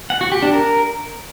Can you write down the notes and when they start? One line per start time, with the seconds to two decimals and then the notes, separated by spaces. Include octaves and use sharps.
0.10 F#5
0.21 F#4
0.32 G4
0.43 D4
0.53 A#4